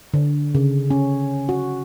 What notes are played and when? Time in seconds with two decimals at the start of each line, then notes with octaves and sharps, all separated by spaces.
0.14 D3
0.55 C#3
0.90 C#4
1.49 F#4